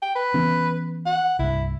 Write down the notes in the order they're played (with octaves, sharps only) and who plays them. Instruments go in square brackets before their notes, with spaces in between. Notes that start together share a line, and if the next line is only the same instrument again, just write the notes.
[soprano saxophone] G5
B4
[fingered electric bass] E3 B3 C#4
[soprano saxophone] F#5
[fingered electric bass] C2 G2 [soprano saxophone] E4